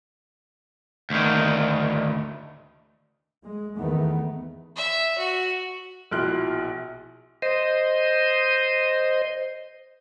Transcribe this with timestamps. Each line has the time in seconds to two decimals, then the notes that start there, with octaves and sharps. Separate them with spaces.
1.10 D2 D#3
3.44 G#3
3.79 E2 D#3 A3 B3
4.76 E5
5.18 F#4
6.11 A#1 B2 E4 C6 F6 F#6
7.42 C5 D#5